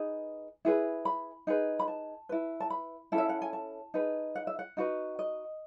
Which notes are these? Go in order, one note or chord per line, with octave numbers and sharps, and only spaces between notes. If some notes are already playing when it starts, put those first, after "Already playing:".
Already playing: D#4 G#4 B4
E4 G#4 B4
B5
D#4 G#4 B4
B5
A5
E4 B4
A5
B5
C#4 E4 A4
E5
F#5
G#5
A5
D#4 G#4 B4
F#5
E5
F#5
D#4 F#4 B4
D#5